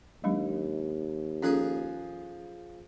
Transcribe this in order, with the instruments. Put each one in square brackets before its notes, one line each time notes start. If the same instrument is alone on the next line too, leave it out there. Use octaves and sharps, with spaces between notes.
[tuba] D#2 [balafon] F#3 G#3 D4
[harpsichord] F3 G#4 [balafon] C#4 A4